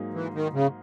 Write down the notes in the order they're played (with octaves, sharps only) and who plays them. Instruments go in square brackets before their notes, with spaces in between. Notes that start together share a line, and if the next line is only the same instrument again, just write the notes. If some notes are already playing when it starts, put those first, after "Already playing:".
Already playing: [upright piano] G#2 F#3 A#3 D#4 G#4
[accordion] E3
D#3
C#3